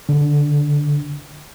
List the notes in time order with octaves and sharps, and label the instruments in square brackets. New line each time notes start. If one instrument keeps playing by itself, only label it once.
[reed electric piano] D3